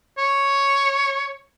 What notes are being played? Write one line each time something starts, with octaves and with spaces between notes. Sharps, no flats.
C#5